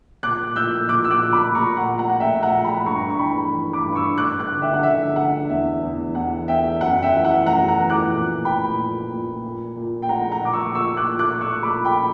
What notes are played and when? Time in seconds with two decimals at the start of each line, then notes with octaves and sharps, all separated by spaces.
0.23 A#2 D6 F#6
0.56 A#2 E6 G6
0.88 A#2 D6 F#6
1.04 E6
1.11 D6 F#6
1.22 A#2
1.32 B5 D6
1.55 A#2 A#5 C#6
1.77 F#5
1.88 A#2
1.98 F#5 A#5
2.10 F#5
2.20 A#2 E5 G5
2.42 F#5 A#5
2.53 A#2
2.65 G5 B5
2.80 B5
2.86 G2 A#5 C#6
3.10 C#6
3.19 E3 G5 B5
3.52 E3
3.73 B5 D6
3.85 G2
3.95 C#6 E6
4.18 G2 D6 F#6
4.39 D6 F#6
4.51 D3
4.62 E5 G5
4.74 F#5
4.83 D3 E5
5.16 D3 F#5
5.49 E2 E5
5.82 E2
6.15 E2 F#5
6.48 E2 E5 G5
6.80 F#2 F#5
7.03 E5 G5
7.14 E3
7.25 F#5
7.46 F#2 F#5 A#5
7.68 F#5 A#5
7.79 E3
7.90 D6 F#6
8.12 A#2
8.45 A#2 G5 B5
8.78 A#2
9.11 A#2
9.44 A#2
9.76 A#2
10.02 G5
10.09 A#2 F#5 A#5
10.32 F#5 A#5
10.42 A#2 D6
10.53 C#6 E6
10.75 A#2 C#6 E6
10.97 D6 F#6
11.08 A#2
11.19 D6 F#6
11.41 A#2 C#6 E6
11.63 B5 D6
11.74 A#2
11.85 G5 B5